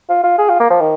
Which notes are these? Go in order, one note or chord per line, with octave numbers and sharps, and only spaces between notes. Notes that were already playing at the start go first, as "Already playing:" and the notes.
F4
F4
G#4
F4
A#3
F3
D#3